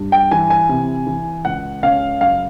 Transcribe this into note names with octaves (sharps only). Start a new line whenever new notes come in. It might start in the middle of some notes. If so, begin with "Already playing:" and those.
Already playing: G2
G5
E3 G#5
G#5
C3
E3
C#2 F#5
C#3 F5
F#2 F5